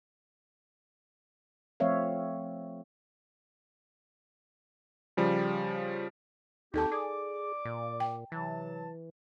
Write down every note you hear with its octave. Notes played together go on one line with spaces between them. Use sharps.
F3 A3 C4 C#5 E5 F5
C#3 F3 G3
D#2 C4 D#4 F#4 G4 A4 A5
G#4 D5 D6
A#2
G5
C3 E3 F#3 A5